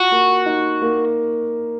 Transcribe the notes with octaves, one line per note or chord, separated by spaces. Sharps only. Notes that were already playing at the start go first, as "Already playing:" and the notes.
Already playing: F4 F#4
A#3
D#4
A#3